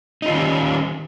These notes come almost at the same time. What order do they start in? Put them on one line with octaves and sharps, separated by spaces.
D#4 F4 D#3 C#4 G4